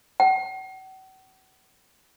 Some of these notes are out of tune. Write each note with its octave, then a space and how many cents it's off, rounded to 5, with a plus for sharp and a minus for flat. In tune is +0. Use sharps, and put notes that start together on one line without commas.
F#5 +45